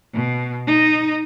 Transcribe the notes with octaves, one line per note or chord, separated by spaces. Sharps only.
B2
D#4 D#5